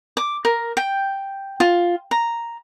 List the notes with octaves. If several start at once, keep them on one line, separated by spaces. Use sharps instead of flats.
D6
A#4
G5
F4
A#5